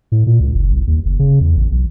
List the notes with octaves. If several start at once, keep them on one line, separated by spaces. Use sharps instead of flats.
A2
A#2
C#2
F#1
C2
D#2
F#1
C#3
E2
A1
B1